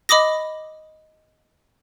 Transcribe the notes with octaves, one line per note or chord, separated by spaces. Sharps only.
D#5 B5 D6 D#6 A#6